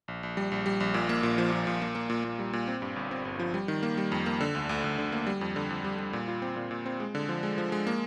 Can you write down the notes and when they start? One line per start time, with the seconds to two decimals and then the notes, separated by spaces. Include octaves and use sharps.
0.08 A#1
0.23 A#1
0.37 G3
0.52 A#1
0.66 G3
0.80 A#1
0.94 A#2
1.09 A#3
1.23 A#2
1.38 F3
1.52 A#2
1.67 A#2
1.82 A#3
1.95 A#3
2.10 A#2
2.24 A#2
2.39 G3
2.53 A#2
2.68 C4
2.82 G2
2.96 G1
3.11 C4
3.25 G1
3.39 F3
3.54 G3
3.68 D#3
3.83 A#3
3.98 G3
4.12 F2
4.26 A#3
4.41 D3
4.55 D2
4.69 D2
4.84 D2
4.98 D3
5.12 A#3
5.27 G3
5.41 F2
5.56 D3
5.70 F2
5.84 G3
5.99 G3
6.13 A#2
6.28 F4
6.42 C4
6.57 A#2
6.71 A#2
6.86 C4
7.00 G#3
7.15 D3
7.29 F3
7.43 G#3
7.58 F3
7.72 G#3
7.87 A#3